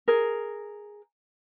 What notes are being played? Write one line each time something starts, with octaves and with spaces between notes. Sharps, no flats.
G#4 A#4